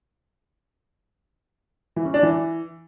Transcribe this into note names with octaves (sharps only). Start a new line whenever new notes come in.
E3
C#4
D4
E3